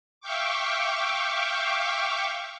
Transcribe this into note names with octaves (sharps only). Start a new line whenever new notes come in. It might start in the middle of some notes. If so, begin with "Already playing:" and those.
E5 F5 G5 C#6 D6